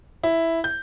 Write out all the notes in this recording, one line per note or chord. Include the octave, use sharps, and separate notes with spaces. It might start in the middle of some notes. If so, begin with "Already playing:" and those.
E4
G6